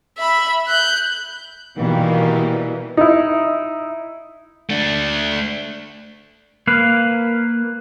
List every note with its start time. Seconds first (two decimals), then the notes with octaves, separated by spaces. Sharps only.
0.18 E5 B5
0.67 F#6 G6
1.77 B2 D#3 E3 G3 A#3
2.97 D#4 E4
4.70 A3 D4
6.67 A#3 B4 F5